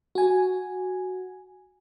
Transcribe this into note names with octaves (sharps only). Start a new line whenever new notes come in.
F#4 G#5